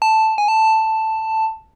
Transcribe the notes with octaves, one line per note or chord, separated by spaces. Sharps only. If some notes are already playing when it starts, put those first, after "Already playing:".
A5
G#5
A5